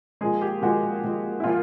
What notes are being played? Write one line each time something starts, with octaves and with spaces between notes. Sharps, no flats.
A#2 F3 G#3 G#4
G4
A#2 F3 G#3 F#4
A#2 F3 G#3
E4
A#2 F3 F4